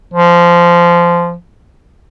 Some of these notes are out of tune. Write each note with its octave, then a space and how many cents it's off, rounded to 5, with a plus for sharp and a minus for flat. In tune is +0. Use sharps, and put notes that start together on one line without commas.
F3 -15